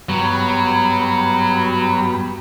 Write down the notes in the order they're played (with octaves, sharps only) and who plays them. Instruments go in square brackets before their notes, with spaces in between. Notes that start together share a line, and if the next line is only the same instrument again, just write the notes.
[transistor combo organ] G2 B3 [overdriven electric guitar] F#3